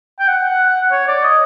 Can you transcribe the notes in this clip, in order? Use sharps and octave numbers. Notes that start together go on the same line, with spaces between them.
G5
F#5
C#5
D5
D#5